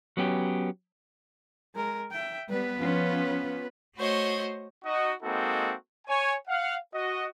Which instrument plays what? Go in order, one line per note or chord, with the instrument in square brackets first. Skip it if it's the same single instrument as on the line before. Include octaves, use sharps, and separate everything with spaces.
[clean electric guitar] F#3 B3 C#4 G4
[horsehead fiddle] G#3 A#4
E5 G5
[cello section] G3 [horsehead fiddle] B3 B4
[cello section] F3 C#4 F4
[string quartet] A3 F#4 C5 C#5 D#5
[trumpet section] D#4 F#4 D#5
G#3 A#3 C4 D#4 F#4 A4
C#5 G#5
F5 F#5
F#4 D#5